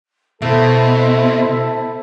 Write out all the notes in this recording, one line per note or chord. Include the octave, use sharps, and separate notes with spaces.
B2 A3 E4 A4 C5 E5